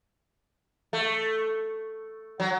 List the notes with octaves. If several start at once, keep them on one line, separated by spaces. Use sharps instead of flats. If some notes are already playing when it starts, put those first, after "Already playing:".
A3
F#3